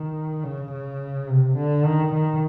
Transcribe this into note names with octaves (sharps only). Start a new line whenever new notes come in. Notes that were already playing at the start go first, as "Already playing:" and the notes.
Already playing: D#3
C#3
C#3
C3
D3
D#3
D#3